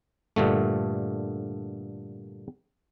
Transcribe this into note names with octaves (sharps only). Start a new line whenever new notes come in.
G2 A#2 D3 A3